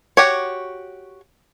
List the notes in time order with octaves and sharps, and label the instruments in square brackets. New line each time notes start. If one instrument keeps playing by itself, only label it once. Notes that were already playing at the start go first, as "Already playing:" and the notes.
[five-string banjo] F#4 G4 C#5